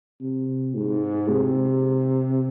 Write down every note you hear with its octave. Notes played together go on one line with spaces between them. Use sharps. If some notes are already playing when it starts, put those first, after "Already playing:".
C3
G#2
C3